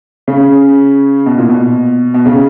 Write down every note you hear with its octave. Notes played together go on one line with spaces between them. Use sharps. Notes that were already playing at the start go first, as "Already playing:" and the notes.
C#3
B2
A#2
B2
B2
C#3